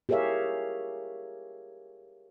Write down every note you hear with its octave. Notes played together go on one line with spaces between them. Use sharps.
G4 G#4 A#4 C#5 E5 F5